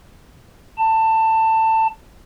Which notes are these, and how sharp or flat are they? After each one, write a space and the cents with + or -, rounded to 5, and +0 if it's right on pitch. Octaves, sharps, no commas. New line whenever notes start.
A5 +20